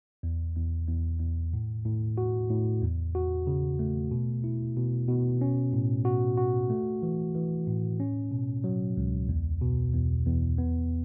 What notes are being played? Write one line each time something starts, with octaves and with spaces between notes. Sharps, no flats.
E2
E2
E2
E2
A2
A2
F#4
A2
E2
F#4
C#3
A3
B2
E4
B2
B2
C#4
A2
F#4
F#4
A3
E3
E3
A2
C#4
B2
F#3
C#2
E2
B2
E2
E2
B3